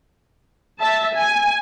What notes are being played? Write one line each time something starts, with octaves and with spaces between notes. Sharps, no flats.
E5 A5
G#5